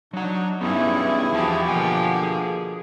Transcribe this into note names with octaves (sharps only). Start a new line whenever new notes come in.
F#3 D4 D#4 F#5
G2 B3 C#4 D#4 E4 G#4
E2 F3 F#4 G4 A5
B2 D3 A#3 F#5 G#5
G#4